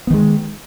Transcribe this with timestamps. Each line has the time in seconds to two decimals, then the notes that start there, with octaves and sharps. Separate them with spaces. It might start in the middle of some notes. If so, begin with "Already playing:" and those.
0.07 B3
0.10 D#3
0.14 G#3